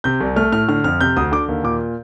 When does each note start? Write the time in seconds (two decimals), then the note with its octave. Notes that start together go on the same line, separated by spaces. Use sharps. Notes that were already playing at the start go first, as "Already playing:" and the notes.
0.04 C3 G6
0.21 C2
0.36 A3 F6
0.52 A2 F6
0.68 D3 F6
0.84 F2 F6
1.01 C3 G6
1.17 D2 D#6
1.32 D3 D6
1.48 D#2
1.64 A#2 D6